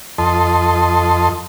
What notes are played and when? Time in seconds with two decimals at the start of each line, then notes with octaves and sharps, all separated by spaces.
0.18 F2 A4 D#5 C6